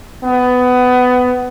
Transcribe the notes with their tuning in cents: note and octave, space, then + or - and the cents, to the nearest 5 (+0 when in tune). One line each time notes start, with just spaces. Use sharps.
B3 +20